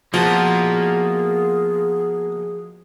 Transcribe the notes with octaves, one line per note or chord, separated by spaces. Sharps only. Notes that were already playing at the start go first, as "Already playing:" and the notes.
B2 F3 A#3 F4 F#4 G#4